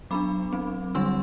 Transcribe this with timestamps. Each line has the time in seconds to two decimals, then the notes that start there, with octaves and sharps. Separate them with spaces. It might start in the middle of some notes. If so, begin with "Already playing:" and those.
0.11 F#3 B3 D4 B5 D6
0.53 F#3 C4
0.95 D3 G3 D4 C6 E6